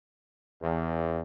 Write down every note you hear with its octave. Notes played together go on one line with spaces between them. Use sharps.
E2